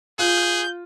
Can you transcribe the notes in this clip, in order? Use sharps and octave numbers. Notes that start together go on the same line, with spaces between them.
F4 G#4 G6